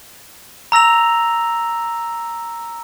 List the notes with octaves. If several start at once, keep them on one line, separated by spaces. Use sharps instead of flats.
A#5 E6 A#6 F7